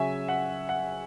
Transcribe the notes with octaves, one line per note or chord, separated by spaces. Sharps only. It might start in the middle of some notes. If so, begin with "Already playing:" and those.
Already playing: C#3 F#3 C#4 E5 G#5
F#5
F#5